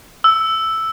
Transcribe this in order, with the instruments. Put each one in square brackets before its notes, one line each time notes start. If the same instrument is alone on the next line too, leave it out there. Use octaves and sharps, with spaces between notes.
[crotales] E6